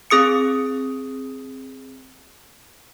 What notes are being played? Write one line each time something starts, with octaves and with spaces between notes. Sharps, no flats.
C4 G#4 D#6 C#7